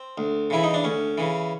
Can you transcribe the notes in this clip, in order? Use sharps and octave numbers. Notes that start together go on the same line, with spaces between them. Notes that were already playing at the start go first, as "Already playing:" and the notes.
Already playing: C4
D2
C#3 E3 E4
D#4
D4
D2 C#4
C#3 E3